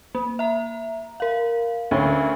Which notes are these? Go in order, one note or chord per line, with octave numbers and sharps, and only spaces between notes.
A#3
E5 A#5
A#4 F5
D2 C#4